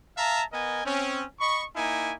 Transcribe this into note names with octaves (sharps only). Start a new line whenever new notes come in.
E5 F5 A5 A#5
B3 A#4 D#5 G#5
C4 C#4
D#5 B5 C#6
A#3 D#4 E4 G#5